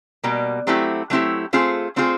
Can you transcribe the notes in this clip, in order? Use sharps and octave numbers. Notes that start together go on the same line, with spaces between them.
B2 G3 A#3
F#3 A3 C4 E4 G4
F#3 A3 C4 E4 G4
A3 C4 F4 G#4 C5
A3 C4 F4 G#4 C5